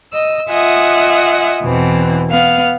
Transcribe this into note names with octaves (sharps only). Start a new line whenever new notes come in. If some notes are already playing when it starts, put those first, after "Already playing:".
D#5 E6
F4 D#5 E5 F#5 G#5 D#6
E2 B2 E3 C4
B3 F5 F6